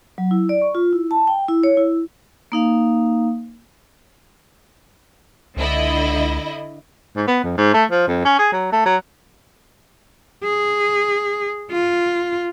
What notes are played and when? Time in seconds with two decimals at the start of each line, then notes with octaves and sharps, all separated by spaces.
0.18 F#3
0.31 E4
0.49 D5
0.61 C#6
0.75 F4
0.93 E4
1.11 A5
1.27 G5
1.48 E4
1.63 C#5
1.77 E4
2.52 A#3 D#4 F5
5.57 C#2 D3 E4 D#5
7.16 G#2
7.28 B3
7.44 F2
7.58 G#2
7.74 A3
7.91 F3
8.07 F2
8.25 C#4
8.39 G#4
8.53 F#3
8.73 A3
8.86 F#3
10.44 G#4
11.72 F4